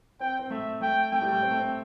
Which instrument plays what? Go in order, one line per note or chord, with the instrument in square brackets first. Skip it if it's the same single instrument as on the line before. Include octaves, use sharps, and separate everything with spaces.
[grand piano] C4 [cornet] G5
[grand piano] C4
[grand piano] A3 [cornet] E5
[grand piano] A3 [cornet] G5
[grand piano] A3 [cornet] G5
[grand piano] G3
A3
C4
A3
C4